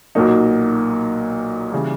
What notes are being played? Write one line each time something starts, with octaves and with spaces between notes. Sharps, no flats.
B1 A#2 F#3 A#3 D#4
C#3 E3 G3